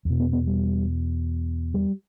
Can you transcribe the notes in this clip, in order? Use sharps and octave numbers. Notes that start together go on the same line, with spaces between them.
E2 B2
B3
B3
G3
G3